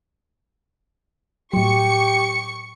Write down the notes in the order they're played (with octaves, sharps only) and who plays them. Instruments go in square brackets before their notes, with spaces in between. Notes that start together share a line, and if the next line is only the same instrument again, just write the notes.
[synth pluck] A2 F#3 [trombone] G4 [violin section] C#6 C#7